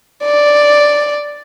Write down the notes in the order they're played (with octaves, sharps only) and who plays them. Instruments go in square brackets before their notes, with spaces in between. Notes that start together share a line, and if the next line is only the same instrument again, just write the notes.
[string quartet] D5